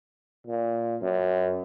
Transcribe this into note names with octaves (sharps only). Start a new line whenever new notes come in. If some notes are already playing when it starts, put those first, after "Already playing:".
A#2
F#2